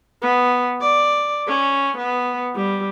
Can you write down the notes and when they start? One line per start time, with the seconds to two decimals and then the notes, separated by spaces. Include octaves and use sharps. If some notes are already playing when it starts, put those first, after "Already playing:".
0.22 B3
0.81 D5
1.47 C#4
1.98 B3
2.55 G3